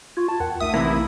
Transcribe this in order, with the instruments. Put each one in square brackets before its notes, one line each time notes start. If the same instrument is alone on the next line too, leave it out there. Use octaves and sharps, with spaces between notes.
[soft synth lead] F4 [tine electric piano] C#6 G#6
[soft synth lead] A5
[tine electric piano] E2 A#4 G5 [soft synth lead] F#5
[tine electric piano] A#1 A3 D#4 [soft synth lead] E5 [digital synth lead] D#6
[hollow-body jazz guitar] C3 E3 A#3 [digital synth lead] E4